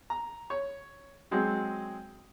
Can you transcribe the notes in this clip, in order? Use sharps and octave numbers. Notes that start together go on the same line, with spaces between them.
A#5
C#5
F#3 G#3 C4